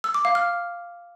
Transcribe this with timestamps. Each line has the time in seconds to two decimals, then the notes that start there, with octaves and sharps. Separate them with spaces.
0.04 E6
0.14 D6
0.25 F5
0.35 F6